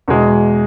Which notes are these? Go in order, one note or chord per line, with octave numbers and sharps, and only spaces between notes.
E2 B2 G#3